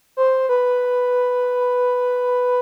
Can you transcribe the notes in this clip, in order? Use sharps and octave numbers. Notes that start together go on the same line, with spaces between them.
C5
B4